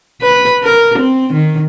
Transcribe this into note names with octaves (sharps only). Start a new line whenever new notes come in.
B4
A#4
C4
D#3